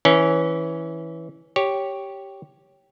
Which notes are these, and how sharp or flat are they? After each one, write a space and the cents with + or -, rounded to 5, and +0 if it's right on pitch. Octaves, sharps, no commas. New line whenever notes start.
E3 -10 C#4 +0
G4 -5 C#5 +0